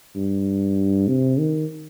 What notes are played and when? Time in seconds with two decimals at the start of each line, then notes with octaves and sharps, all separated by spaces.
0.16 G2
1.08 C3
1.39 D#3